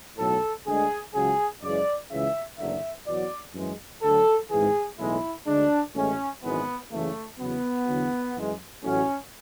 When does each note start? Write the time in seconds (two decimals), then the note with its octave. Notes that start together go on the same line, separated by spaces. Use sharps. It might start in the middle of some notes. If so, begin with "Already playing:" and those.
0.18 B1 A2 F#3 A4
0.67 D2 D3 G#3 G#4
1.15 C#2 C#3 F#3 G#4
1.63 F#2 C#3 E3 G#3 D5
2.11 C#2 C#3 E3 E5
2.59 F#1 E2 D3 F#3 E5
3.07 E2 B2 F#3 D5
3.55 F#2 E3 G#3
4.03 D2 D3 F#3 A4
4.51 G#1 G#2 E3 G#4
4.99 B1 A2 E3 G#3 E4
5.47 D2 D3 G#3 D4
5.96 A1 A2 G#3 C#4
6.44 G#1 F#2 E3 G#3 B3
6.92 F#1 E2 C#3 E3 A3
7.40 E2 C#3 F#3 B3
7.88 E2 D3 F#3
8.37 F#2 E3 G#3
8.83 A1 A2 F#3 C#4